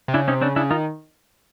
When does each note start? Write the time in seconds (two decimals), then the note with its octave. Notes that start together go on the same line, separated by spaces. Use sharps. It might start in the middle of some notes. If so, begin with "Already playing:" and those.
0.08 C3
0.14 C#3 D4 E4
0.28 C3 C#4 D#4
0.41 C#3 C4 D4
0.56 C#3 D4 E4
0.70 D#3 D#4 F4